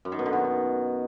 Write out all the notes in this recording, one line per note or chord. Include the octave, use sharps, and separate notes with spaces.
F#2
D#3
B2
D3
D#3